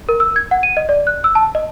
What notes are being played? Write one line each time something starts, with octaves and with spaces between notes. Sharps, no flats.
A#4
E6
G#6
F#5
D#7
D#5
D5
F#6
E6
A5
D#5